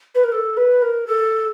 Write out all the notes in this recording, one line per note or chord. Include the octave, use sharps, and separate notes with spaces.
B4
A#4
A4
B4
A#4
A4